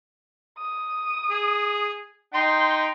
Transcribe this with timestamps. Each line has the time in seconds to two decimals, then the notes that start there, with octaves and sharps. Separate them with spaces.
0.58 D#6
1.30 G#4
2.34 D#4 G5 C6